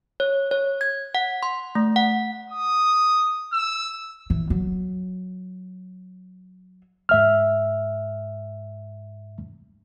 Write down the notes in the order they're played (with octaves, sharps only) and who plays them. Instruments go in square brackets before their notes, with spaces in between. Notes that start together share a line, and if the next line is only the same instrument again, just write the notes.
[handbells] C#5
C#5
G#6
F#5
C6
A3
F#5
[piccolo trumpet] D#6
E6
[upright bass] E3
F#3
[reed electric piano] G#2 E5 F6